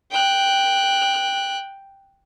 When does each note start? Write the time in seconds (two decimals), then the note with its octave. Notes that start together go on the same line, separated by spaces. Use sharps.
0.11 G5 F#6